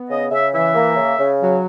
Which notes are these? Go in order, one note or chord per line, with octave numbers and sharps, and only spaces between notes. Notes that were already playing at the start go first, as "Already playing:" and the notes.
Already playing: B3
C#3 D#5
C#3 E5
E3 E5
A#3
C#3
C#3
F#3